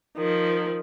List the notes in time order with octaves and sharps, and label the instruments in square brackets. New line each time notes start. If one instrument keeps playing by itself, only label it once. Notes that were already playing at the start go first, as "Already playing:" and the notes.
[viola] D#3 F3